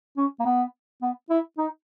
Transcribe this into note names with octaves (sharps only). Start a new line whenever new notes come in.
C#4
A#3
B3
B3
E4
D#4